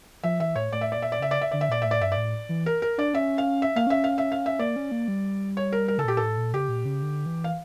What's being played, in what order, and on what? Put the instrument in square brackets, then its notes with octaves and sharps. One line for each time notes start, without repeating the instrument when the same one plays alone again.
[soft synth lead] F3 [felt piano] E5
[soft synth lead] E3 [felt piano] E5
[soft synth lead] A2 [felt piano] C#5
[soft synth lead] A2 [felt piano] D5
[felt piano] E5
[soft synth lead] A#2 [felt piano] D5
[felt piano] E5
D5
[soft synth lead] C#3 [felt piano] E5
[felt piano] D5
E5
[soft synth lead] D3 [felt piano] D5
[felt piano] E5
[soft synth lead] A#2 [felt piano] D5
[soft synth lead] A2 [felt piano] E5
[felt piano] D5
[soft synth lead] G2 [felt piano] E5
[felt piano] D5
[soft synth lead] A2
E3
[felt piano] A#4
A#4
[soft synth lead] D4 [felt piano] D5
[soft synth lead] C#4 [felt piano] E5
[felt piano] F5
E5
[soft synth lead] A#3 [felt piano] F5
[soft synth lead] C#4 [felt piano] E5
[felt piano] F5
E5
F5
E5
[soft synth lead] A#3 [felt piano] D5
[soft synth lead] C#4
A#3
G3
[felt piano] C#5
A#4
A#4
[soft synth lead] C#3 [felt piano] A4
[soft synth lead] A#2 [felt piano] G4
[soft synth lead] A2 [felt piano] A4
[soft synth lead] A#2
[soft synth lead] C#3 [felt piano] G4
[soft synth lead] A#2
C#3
D3
E3
[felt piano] F5